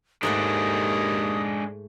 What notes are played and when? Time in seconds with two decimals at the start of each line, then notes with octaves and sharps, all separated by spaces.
0.23 D#2 G#2 G#3 A3 D4 F#5 D#6